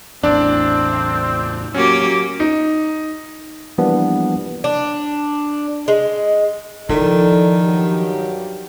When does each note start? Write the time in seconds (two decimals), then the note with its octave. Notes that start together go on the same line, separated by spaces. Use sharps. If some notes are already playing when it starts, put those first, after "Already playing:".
0.23 A1 E2 C4 D4 D5
1.74 F#3 A#3 C#4 G4
2.40 D#4
3.78 E3 F3 G3 A#3 B3 D4
4.64 D4
5.88 G#3
6.89 D#3 F3 E4 A4 D5
7.63 G2 F#3 G4